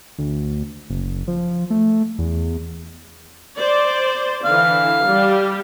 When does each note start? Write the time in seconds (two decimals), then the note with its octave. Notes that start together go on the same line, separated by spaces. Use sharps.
0.18 D2
0.90 F#1
1.28 F3
1.70 A3
2.19 E2
3.57 C5 D5
4.45 D3 E3 F5
5.09 G3 G4